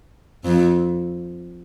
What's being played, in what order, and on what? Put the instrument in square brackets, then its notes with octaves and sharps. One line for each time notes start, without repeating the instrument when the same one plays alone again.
[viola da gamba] F2